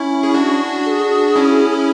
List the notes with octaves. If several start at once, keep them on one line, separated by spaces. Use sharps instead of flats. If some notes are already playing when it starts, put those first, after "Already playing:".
Already playing: C#4 E4
G#4
D4 F#4
A4
G#4
C#4 E4